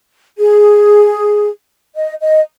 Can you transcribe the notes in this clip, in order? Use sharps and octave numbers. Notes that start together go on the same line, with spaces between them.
G#4
D#5
D#5